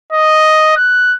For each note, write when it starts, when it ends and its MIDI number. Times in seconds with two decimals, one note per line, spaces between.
0.12 0.72 75
0.77 1.14 90